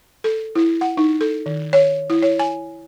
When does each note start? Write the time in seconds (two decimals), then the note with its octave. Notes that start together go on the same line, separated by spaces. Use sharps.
0.24 A4
0.55 E4
0.81 F#5
0.97 D#4
1.21 A4
1.46 D#3
1.73 C#5
2.10 E4
2.22 C#5
2.39 G#5